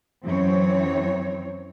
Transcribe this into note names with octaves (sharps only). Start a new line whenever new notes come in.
F#2 E3 C4 C#5